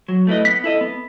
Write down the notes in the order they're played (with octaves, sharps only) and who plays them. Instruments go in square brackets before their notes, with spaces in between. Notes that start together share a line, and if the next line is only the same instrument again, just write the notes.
[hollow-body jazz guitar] F#3
A3 E4 B4 D#5
[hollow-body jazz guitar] B3 [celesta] B6
[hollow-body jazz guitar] E4 A4 D#5
B3